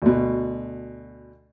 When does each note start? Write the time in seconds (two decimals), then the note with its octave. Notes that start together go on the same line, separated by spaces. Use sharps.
0.02 D2 B2